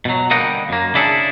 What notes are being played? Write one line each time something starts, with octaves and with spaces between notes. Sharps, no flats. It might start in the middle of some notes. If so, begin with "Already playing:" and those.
B2 F#3
D3 G3 A#3 D#5 F#5 G5
F#2 A#3
C#3 D4 E4 G#4 A4